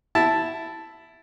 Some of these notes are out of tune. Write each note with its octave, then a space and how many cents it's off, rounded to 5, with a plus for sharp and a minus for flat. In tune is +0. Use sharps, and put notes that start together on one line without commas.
E4 +0 A5 +0